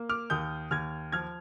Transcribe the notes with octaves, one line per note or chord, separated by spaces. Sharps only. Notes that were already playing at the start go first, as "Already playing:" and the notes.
Already playing: A#3
D6 F6
D#2 D#6 G6
D#2 F6 G#6
F3 F6 G#6